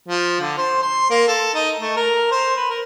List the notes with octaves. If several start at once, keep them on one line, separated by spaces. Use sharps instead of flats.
F3
D3
C5
C6
A#3
A4
D#4
A3
A#4
C5
B4
A#4